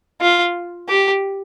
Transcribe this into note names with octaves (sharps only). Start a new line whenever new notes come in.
F4
G4